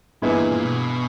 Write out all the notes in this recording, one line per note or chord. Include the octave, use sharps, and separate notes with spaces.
G2 A#2 E3 G#3 B3 E4
A#2
B2